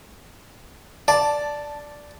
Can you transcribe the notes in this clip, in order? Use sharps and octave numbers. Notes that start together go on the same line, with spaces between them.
D5 A5